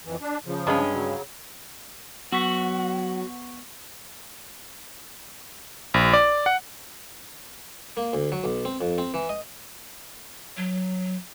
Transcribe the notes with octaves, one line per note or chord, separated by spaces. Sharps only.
F2 E3
D4
C#3 F3
G2 G#3 C#4
C#3 F#3
F#3 B3 F#4 F#5 C#6 B6
A#1
D5
F#5
A#3
D2
F#3
B1
C4
F2
C4
E3
D#5
F#3